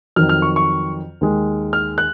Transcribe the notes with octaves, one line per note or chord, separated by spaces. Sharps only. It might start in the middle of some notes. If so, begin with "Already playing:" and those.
F2 D#3 F#3 F6
F6
C#6
C#6
D#2 D#3 G#3
F6
F#6